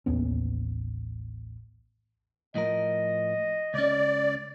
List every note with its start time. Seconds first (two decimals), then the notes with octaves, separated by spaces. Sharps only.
0.06 A1 D#2 B3 C#4
2.55 A2 F3 A#4 D#5
3.74 C#2 C#4 D5